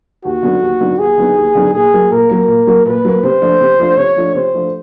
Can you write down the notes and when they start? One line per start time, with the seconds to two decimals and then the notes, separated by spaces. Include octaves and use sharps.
0.24 D#2 F#4
0.43 D3 F#3 B3 D#4
0.62 D#2
0.80 D3 F#3 B3 D#4
0.99 D#2 G#4
1.18 D3 F#3 B3 D#4
1.37 D#2
1.55 D3 F#3 B3 D#4
1.73 A#2 G#4
1.93 F#3 A#3
2.11 A#2 A#4
2.30 F#3 A#3
2.48 A#2
2.67 F#3 A#3
2.86 A#2 B4
3.05 F#3 A#3
3.23 C3 C5
3.41 F3 A3 D4 F4
3.61 C3
3.79 F3 A3 D4 F4
3.97 C3 C#5
4.16 F3 A3 D4 F4
4.35 C3 C5
4.54 F3 A3 D4 F4